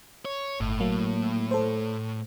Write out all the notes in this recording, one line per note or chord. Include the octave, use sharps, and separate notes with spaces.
C#5
G1 A2
F#3 A#3
A4 C5